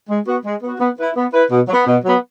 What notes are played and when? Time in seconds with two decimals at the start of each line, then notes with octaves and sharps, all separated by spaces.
0.09 G#3
0.27 B3 F#4
0.45 G#3
0.63 B3 F#4
0.80 B3
0.99 E4 B4
1.16 B3
1.34 E4 B4
1.51 B2
1.68 F#3
1.73 B3
1.87 B2
2.05 F#3 B3